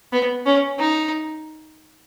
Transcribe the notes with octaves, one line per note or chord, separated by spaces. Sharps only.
B3
C#4
D#4